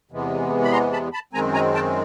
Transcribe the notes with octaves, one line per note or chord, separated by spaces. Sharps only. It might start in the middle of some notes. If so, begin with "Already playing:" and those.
E2 C3 E3 G#3 B3
B5
A#5 C6
A5 B5
A5 B5
F#2 D#3 G#3 C4 G#5 A#5
G#5 A#5
G5 A5